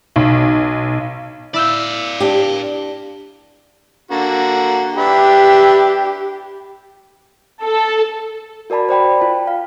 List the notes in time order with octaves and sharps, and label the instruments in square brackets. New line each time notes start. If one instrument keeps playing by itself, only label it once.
[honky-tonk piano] B1
[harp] E4 E6 G6 [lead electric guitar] D5 F5
[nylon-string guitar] D4 G4
[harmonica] D3 A#3 F#4
[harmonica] D4 B4 E5 [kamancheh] G4
[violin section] A4
[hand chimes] F#4 A#4 D5 A5 B5
C5 D5 G5 B5
F4 G5 A5
F5